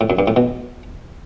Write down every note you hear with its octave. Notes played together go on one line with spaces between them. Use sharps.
A2
F#2
G2
A2
B2